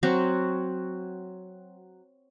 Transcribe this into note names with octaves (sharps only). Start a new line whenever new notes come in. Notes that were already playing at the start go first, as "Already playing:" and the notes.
F#3 C4 F#4